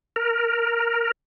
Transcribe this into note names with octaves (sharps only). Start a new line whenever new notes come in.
A#4